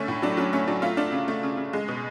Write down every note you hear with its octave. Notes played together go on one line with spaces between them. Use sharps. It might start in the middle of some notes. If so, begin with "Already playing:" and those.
Already playing: D3 A3 C#4
A2
F#3 D4
F#3 C#4
A3 C#4
F#3 D4
A3 F4
A3 D4
C#3
A3
C#3
C#3
G#3
B2